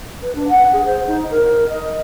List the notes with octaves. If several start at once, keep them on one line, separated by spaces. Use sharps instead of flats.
B4
D4
F#5
G#4
C5
D#4
A#4
D#5